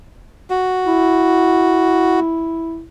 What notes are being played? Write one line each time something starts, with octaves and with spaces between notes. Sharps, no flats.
F#4
E4